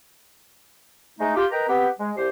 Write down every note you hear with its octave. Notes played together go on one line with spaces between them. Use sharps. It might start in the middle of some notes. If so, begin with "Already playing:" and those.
G#3 A3 D#4
F4 G4
A#4 B4 D#5 G5 A#5
B3 C4 G4
G#3
C2 G4 C5